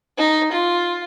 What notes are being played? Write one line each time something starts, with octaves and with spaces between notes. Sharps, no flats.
D#4
F4